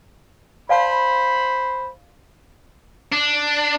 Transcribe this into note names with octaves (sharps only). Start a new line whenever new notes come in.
C5 D5 F5 A5 B5
D4